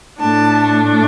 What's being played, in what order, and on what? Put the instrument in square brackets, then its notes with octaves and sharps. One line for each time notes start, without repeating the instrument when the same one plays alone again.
[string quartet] A2 A3 D4 A5